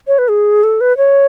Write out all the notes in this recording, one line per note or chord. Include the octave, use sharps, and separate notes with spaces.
C#5
B4
G#4
A4
B4
C#5